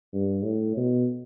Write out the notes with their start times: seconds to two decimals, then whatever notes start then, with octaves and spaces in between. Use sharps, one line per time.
0.13 G2
0.44 A2
0.77 B2